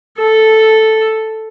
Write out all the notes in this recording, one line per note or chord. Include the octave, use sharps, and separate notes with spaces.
A4